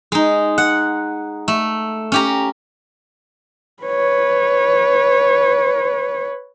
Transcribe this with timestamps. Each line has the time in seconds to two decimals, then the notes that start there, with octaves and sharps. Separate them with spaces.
0.12 G#3 D#4
0.58 F#5
1.48 A3
2.12 C#4 G4 A#5
3.83 B4 C#5